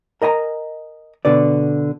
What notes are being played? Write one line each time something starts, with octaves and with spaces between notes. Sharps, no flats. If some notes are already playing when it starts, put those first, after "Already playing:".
A#4 D#5 G#5 A#5
B2 D3 B4 D5